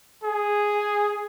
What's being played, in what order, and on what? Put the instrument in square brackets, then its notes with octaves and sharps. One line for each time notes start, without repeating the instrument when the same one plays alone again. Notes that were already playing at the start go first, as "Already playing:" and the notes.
[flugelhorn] G#4